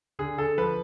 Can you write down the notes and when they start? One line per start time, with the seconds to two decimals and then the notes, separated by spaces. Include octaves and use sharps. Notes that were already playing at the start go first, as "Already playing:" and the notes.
0.19 D3 G#4
0.38 D3 A4
0.58 F3 B4